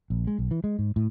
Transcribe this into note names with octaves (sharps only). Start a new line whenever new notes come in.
A#1
G#3
B1
E3
G#3
G#2
A2